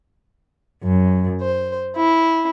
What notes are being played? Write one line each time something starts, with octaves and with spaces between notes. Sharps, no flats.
F#2
C5
E4